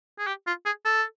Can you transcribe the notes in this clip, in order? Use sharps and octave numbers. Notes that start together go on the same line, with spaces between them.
G#4
G4
F4
G#4
A4